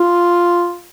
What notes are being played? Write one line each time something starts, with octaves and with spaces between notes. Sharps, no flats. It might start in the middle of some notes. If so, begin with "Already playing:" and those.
Already playing: F4